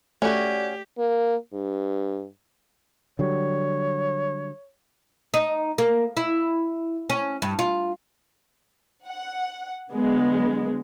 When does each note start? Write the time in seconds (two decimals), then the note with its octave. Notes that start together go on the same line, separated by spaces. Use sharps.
0.22 A3 C#4 F#4 G4 D5
0.99 A#3
1.53 G2
3.19 D3 F#3 G3 C#5
5.34 D#4
5.78 A#3
6.17 E4
7.10 C#4
7.42 G2
7.59 F4
9.06 F#5
9.90 D3 F#3 G#3 B3